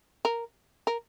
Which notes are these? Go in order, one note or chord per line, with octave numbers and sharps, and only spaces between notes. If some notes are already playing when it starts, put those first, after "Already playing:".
A#4
A#4